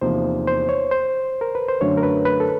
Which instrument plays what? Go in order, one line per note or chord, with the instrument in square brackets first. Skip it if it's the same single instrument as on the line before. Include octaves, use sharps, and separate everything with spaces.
[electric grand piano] E2 C3 F3 A#3 D#4 [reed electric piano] C5
[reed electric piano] C5
C#5
C5
A#4
B4
C5
[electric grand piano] F#2 D3 F#3 A3 D4 [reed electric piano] C#5
[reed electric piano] A#4
B4
B4
A4